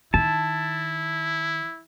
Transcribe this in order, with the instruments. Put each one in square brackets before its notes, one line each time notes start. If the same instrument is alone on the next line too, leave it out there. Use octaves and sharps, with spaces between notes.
[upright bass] D#3 [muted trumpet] E4 [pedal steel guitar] A5